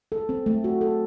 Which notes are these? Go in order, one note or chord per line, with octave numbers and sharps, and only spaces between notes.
A4
C4
A3
F#4
A4